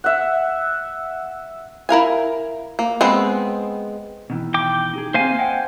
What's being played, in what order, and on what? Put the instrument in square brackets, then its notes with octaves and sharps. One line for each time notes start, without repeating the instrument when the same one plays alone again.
[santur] E5 F#5
[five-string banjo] E4 A#4 F5 G#5
A#3
G#3 B3 C4
[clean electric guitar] B2 D#3 E3
[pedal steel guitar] G5 D6
[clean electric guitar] D#4 G4 G#4
[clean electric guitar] A#3 C4 [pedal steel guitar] C5 F5 G#5
[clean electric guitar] D#5 F#5 G5